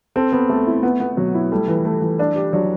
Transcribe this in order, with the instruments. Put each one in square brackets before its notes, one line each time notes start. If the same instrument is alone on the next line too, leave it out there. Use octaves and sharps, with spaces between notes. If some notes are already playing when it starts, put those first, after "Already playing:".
[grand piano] C4 [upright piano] A4
[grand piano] B3 [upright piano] A4
[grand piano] A3 [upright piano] A4
[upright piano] E4
B3
B3
[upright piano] B2 [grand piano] F#3
[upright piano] E4
[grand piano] G3 [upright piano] A3
[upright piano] E3
A3
E3
D4
G4
[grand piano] F#3 [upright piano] D4